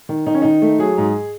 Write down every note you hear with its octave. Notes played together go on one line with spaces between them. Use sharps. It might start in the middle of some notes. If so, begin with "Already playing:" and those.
D#3
D#3 D#4
C#4
D#3 D#4
A3
F#3 G#4
G#2